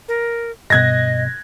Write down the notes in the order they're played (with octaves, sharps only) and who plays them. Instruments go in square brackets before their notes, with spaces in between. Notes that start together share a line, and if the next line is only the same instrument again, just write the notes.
[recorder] A#4
[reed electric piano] G2 B2 [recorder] D#5 [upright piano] F#6 G#6 A#6